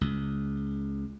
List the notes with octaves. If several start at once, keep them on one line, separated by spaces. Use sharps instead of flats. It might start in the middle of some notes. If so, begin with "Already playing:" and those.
C#2